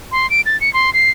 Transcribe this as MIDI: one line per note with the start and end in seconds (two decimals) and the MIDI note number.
0.12 0.29 84
0.30 0.41 98
0.46 0.59 93
0.61 0.72 97
0.73 0.93 84
0.93 1.10 96